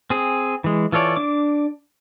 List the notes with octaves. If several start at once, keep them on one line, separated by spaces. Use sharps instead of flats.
C4 G#4
E3 G#3
E3 F4 A4 C#5 D5
D4 D6